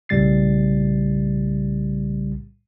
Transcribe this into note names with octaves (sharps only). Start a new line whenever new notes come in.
B1 A2 C#3 G3 A6 C7